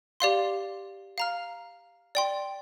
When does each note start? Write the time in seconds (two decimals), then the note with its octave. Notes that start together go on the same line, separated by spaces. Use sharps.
0.20 G4 D5 F5 C6
1.18 F5 A#5 F6
2.15 D5 G5 C6